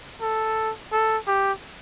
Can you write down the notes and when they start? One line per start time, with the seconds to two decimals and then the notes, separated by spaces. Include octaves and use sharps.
0.21 A4
0.92 A4
1.27 G4